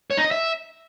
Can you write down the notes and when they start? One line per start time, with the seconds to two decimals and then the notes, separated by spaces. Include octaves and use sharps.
0.11 C#5
0.17 D#4
0.24 D#5
0.31 E5